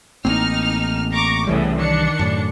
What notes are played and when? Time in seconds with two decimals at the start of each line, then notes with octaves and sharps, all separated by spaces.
0.25 A1 A#3 C4 D#4 F6
1.13 A#5 C#6 D6
1.47 C2 A2 C#3 E3 G3 B3
1.77 D#3 D4 C#7
2.19 F#2 A2